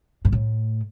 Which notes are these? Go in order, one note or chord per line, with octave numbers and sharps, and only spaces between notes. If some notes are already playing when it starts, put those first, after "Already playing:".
G#2
A2